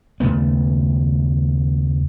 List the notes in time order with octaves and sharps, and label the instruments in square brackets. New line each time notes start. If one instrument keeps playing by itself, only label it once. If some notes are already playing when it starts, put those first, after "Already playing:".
[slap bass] D#2 C#3 A3 B3